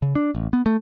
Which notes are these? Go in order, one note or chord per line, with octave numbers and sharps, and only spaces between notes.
C#3
D4
A1
B3
A3